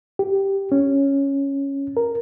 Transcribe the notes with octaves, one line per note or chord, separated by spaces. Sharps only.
G4
C#4
A#4